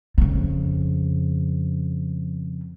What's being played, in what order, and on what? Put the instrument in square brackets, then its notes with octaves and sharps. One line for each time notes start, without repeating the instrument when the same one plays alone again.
[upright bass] F2 C#3